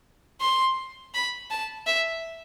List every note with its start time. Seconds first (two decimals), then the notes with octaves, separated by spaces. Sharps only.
0.41 C6
1.14 B5
1.51 A5
1.86 E5